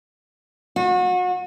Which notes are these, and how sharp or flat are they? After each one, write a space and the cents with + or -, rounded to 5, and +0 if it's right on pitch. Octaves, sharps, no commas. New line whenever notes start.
F#4 -35